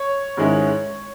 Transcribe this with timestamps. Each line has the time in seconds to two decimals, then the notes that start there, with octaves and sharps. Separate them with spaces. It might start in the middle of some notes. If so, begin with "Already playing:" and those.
Already playing: C#5
0.37 G#2 D#3 G#3 C#4 E4